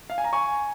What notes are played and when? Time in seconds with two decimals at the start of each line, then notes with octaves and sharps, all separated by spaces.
0.10 F5
0.18 G#5
0.24 A#5
0.33 G#5 C#6